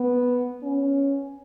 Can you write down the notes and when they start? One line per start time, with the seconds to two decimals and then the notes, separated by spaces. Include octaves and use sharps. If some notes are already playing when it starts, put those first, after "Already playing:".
Already playing: B3
0.63 C#4